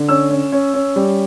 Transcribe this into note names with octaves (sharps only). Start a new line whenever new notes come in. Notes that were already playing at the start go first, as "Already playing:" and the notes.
Already playing: D3
C#4 E6
C#4
C#4
C#4
G3